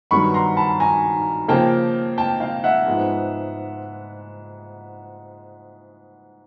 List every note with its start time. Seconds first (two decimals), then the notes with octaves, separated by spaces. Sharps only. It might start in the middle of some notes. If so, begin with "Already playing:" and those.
0.11 G2 D#3 F#3 B3 B5 C#6
0.34 A#5 C6
0.57 A5 B5
0.80 G#5 A#5
1.48 C#3 F3 A#3 G5 A5
2.18 G5 A5
2.40 F5 G5
2.64 E5 F#5
2.86 G#2 F3 G#3 B3